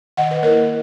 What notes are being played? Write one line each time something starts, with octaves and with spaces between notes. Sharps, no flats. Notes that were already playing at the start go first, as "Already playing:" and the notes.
D#3 D#5 F#5
B4
A#3 E4 A#4 C#5